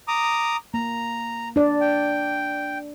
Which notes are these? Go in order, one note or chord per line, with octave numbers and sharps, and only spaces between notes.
A#5 D6 D#6
A#3 A#5
D4 D5
G5